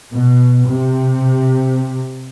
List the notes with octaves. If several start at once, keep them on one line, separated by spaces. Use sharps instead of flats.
B2
C3